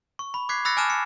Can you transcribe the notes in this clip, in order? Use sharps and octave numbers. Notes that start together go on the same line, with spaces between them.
C#6
B5
D6 F#6 G#6 B6 C7
B5 E6 F#6 A6 A#6 C#7
G#5 A5 D6 F6 F#6 E7
C#7